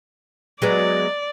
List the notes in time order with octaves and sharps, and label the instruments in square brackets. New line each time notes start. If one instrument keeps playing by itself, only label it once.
[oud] F#3 G#3 B3 [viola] D5